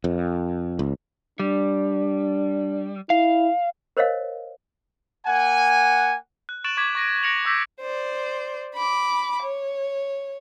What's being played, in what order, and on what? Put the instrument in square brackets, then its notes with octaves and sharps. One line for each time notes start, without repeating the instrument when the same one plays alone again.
[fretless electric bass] F2
C#2
[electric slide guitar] G3 [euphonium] D4
[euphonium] E4 [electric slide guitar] F5
[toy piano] A#4 C5 C#5 D#5 F5
[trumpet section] A#3 G#5 [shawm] F#5
[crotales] F#6
C#6 F#6 A6 D7 E7 F#7
C#6 D6 G#6 B6 E7
C#6 A#6 D7
F#6 A#6 C#7 D7 F7 F#7
C#6 D6 E6 G6 A#6 B6
[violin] C5 D5
B5 D6
C#5